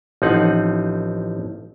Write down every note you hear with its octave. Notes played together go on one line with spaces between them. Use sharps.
A1 F3 C4 D#4 F#5